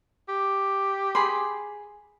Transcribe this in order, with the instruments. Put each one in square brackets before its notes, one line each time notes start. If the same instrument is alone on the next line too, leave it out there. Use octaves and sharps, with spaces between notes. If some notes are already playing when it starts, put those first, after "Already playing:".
[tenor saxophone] G4
[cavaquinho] G#4 B5 C6